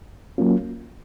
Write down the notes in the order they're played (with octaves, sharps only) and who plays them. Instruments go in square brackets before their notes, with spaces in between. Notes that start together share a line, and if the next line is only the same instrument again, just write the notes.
[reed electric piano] F#3 A#3 C#4 F4